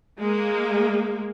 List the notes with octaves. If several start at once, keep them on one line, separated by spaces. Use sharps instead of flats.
G#3 A#3